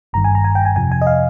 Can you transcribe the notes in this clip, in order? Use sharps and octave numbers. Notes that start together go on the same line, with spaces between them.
G1 G2 D#3 A#5
G#5
A#5
G#5
G5
G#5
F2 C3 F3 G#5
G#5
D#5
F5